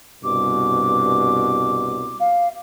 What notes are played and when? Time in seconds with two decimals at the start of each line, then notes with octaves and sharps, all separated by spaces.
0.24 C2 G2 B2 D6
2.20 F5